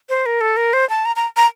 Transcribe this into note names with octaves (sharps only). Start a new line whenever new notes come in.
C5
A#4
A4
A#4
C5
A5
A#5
A#5
A#5